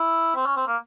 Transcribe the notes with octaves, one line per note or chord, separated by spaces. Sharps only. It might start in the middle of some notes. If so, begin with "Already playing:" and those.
Already playing: E4
C4
C#4
C4
A#3